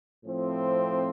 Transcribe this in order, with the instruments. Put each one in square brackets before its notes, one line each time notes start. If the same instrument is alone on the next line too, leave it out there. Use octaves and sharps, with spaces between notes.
[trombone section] A2 F3 C4